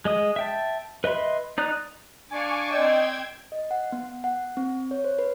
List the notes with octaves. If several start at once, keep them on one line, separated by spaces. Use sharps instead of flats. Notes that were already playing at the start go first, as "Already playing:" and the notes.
G#3 D#5 D#6
E5 G5 A5
B4 D#5 E5 B5 C6
D#4 D5 A#5 D#6 F#6
D4 D5 F5 G#5 C#6 D6
C4 D5 D#5 G5 E6 G#6
D#5
F#5
B3
F#5
C4
C#5
C5
B4